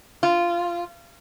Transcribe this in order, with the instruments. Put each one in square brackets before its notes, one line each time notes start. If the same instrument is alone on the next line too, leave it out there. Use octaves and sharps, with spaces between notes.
[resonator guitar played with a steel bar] F4